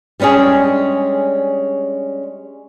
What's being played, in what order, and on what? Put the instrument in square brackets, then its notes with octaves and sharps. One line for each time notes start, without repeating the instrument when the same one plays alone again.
[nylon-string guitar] G3 G#3 C#4 D4 G#4